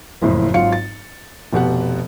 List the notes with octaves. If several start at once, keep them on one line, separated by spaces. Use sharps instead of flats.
F#1 F2 A2 F3
G#1 F#3 F4 F5 C#7
A6
F1 B2 G4 F#5